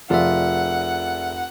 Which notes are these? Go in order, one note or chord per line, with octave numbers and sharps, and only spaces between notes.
F1 F4 G#4 D5 E5 F#5